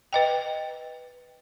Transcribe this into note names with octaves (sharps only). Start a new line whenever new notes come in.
B4 D#5 G5